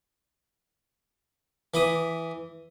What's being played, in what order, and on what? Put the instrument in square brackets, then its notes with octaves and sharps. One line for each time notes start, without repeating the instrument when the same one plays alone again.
[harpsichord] E3 B5 D6 D#6